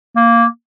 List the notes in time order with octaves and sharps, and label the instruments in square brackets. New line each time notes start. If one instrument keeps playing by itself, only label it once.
[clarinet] A#3